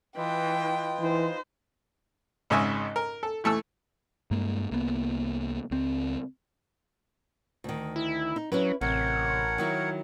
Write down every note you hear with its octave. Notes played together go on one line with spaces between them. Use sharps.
E3 F4 B4 D#5 G5
E3 D#4 C5
G#1 G#2 C#3 D#5 E5 G#5
A#4
A4
E3 A3 A5 E6
G2 G#3 A#3
C2 A#3 B3
C#2 C4
D2 D#3
E4
D#4
F#3 C#4 E4 B4
A1 C3 A#4 C#5 F#5
D#3 F#3 E4